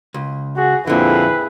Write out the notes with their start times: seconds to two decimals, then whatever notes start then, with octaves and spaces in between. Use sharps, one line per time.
0.14 C#2
0.56 F#4 G#4
0.87 F2 A#2 D3 E4 G#4 B4